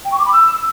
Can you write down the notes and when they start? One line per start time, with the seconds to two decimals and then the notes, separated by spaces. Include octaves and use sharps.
0.05 G5
0.12 C#6
0.19 D6
0.26 B5
0.33 E6